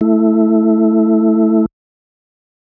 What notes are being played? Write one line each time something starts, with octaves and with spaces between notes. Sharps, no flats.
A3 E4